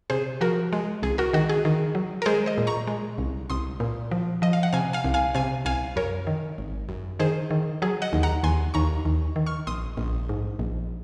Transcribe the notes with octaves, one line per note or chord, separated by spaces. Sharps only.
C3 G#4 C5
F3 F#4 A#4
G#3
C2 G#4
F#4 A#4
D#3 F#4
G#4
D#3
F#3
A#4
G#3 G#4 C5
C5 D#5
A#2
A#5 C#6
G#3
C2
C2 C6 D#6
A#2
F3
F3 D#5
F5
F#5
C3 F5 G#5
F5 G#5
C2
F5 G#5
C3 F5 G#5
C2 F5 G#5
F#2 A#4 C#5
D#3
G#1
F#2
D#3 G#4 C5
D#3
F#3 G#4
D#5 F#5
D#2
F#5 A#5
D#2 G#5 C6
D#2 A#5 C#6
D#2
D#3
C#6 F6
A#1 C6 D#6
A#1
G#2
A#1